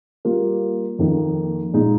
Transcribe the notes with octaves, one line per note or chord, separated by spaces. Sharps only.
G3 A#3 F4
F2 D#3 A#3 D#4
A#2 G#3 D#4